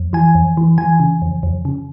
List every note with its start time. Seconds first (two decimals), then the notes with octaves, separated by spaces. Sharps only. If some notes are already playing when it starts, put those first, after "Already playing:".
Already playing: F2
0.13 E3 G#5
0.35 F2
0.57 E3
0.78 E3 G#5
1.00 C#3
1.22 F2
1.43 F2
1.65 C#3